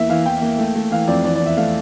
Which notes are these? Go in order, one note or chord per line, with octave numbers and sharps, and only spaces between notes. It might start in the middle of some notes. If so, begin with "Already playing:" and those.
Already playing: E2 A#3 E5
E3 F5
E2 G5
A#3
A3
A3
E3 F5
F2 D5
E3 D5
E2 D5
E5
A3 F5